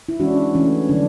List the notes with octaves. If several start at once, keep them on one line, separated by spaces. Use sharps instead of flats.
E4
E3 G#3 C#4 D4 F#4
E3 A3 C#4
D3 F#3 D4